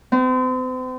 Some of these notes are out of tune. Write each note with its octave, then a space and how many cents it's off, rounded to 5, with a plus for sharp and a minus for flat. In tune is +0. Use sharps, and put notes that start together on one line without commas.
C4 -40